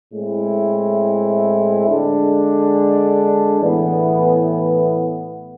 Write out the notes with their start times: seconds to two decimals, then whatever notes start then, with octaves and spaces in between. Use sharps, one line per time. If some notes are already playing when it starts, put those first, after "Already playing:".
0.14 A2 G#3 C4 E4
1.87 D3 G#3 D4
3.61 A2 E3 B3